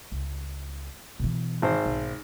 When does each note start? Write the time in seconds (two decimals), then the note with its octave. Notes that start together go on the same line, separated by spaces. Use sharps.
0.12 C#2
1.19 B2 E3
1.62 G#1 C5
1.86 B1